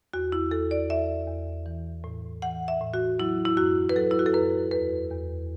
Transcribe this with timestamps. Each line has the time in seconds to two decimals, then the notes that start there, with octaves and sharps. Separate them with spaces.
0.14 E2 F#4
0.32 E4
0.51 E2 A4
0.71 D5
0.90 E2 E5
1.28 E2
1.66 E3
2.04 A2
2.42 E3 F#5
2.68 E5
2.81 A2
2.94 F#4
3.19 F#3 E4
3.45 E4
3.57 F#2 F#4
3.89 B4
3.95 F#3 A4
4.11 E4
4.19 F#4
4.26 A4
4.34 F#2 B4
4.71 E2 B4
5.11 E2